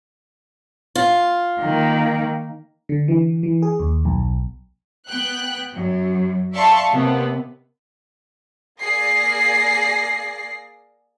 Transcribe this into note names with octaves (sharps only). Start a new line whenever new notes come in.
F4
D#3 A#3
D3
E3
E3
G#4
D#2
B1
B3 G5 F#6
F#2 F#3
D5 E5 F5 A5 C6 C#6
D#2 C3 B3
A#3 G#4 D5 A#6 C7